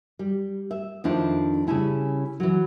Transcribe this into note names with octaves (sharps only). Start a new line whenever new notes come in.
G3
E5
F2 D#3 D4 E4 F4 C5
C#3 G3 C#4 E4 A5
E3 F#3